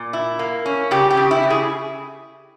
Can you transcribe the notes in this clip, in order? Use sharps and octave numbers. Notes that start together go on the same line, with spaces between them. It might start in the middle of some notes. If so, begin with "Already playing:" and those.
Already playing: A#2
E4
A#3
C#4
C#3 G4
G4
C#3
E4
C#3
G#4